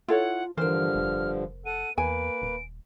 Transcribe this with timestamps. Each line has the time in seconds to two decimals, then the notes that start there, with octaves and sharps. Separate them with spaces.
0.09 E4 F4 A4 C#5 F#5
0.57 G2 D3 E3 F3 A#4 C5 F6
0.95 F1
1.66 A4 F#5 D#7
1.98 E2 A#3 B4 G#5 D7
2.42 D#1